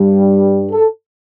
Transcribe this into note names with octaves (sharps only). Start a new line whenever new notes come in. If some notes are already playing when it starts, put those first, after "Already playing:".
Already playing: G2 G3
A4